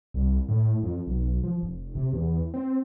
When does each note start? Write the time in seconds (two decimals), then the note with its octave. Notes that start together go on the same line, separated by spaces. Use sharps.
0.14 C2
0.49 A2
0.83 F2
1.07 B1
1.44 F3
1.63 F1
1.95 C3
2.13 E2
2.54 C4